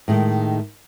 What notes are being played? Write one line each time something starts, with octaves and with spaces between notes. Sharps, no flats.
A2 D#3 G#3